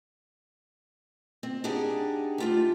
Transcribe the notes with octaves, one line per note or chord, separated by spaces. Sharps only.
C4
D4 D#4 G4 G#4 F#5
A3 F4 G4